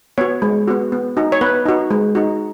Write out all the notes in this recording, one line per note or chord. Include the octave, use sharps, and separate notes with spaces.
B3 F#4 C#5
G#3
B3 F#4
B3
D#4 F#4
C#5
B3 B4
D#4 F#4
G#3
D#4 F#4